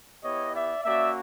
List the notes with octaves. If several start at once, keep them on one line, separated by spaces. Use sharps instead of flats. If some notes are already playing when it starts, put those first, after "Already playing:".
B3 E4 G4 C#5 D#5
D5 E5
A#3 C#4 F#4 D5 E5